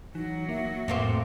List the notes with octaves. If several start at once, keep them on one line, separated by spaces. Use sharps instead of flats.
E3 F#3 D#4 F#4
A#3 E5
F2 A2 A#3 C4